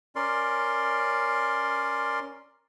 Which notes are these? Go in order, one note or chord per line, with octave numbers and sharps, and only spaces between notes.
C#4 A#4 D5 C6